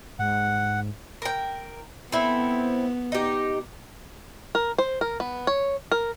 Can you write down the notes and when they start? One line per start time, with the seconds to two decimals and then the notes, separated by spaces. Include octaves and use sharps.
0.19 G#2 F#5
1.22 A#4 G5
2.12 B3 C4 E4 A4
3.12 D#4 G4
4.55 A#4
4.78 C5
5.01 A#4
5.20 B3
5.47 C#5
5.92 A#4